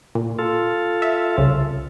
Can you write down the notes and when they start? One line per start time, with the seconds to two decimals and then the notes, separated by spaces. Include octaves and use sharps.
0.15 A#2
0.39 F4 A4
1.02 E5
1.38 C2 C#3